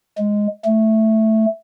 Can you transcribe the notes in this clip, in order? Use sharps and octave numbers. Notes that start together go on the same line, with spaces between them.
G#3
A3